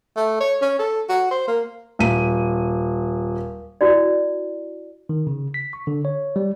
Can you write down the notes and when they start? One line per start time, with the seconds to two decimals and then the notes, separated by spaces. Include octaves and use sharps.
0.17 A3
0.40 C#5
0.61 C#4
0.79 A4
1.09 F#4
1.31 C5
1.48 A#3
1.99 D#1 D#7
3.81 E4 F#4 D5
5.09 D#3
5.27 C#3
5.54 B6
5.73 C#6
5.87 D3
6.05 C#5
6.36 G3